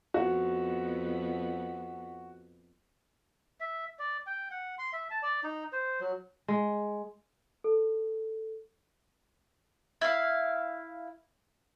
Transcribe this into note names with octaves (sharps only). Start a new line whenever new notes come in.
F2 B3 F#4
E5
D5
G5
F#5
C6
E5
A5
D5
D#4
C5
F#3
G#3
A4
E4 F5